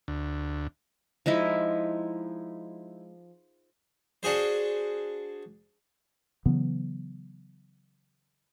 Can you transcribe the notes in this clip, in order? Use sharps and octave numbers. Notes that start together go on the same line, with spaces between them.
D2
F3 G#3 D#4 E4
D4 F#4 G#4 C5
C#3 E3 F#3 B3